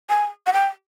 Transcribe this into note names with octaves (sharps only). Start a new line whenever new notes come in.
G#5
F#5
G5